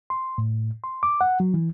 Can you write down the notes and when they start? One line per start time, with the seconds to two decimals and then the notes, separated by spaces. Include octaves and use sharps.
0.10 C6
0.38 A2
0.84 C6
1.03 D6
1.21 F#5
1.40 F#3
1.54 E3